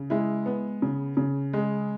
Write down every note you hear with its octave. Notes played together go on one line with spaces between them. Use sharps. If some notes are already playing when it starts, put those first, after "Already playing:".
Already playing: C#3
G#3 E4
B3
C#3
C#3
G#3